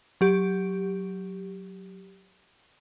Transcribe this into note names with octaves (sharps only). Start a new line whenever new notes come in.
F#3 G4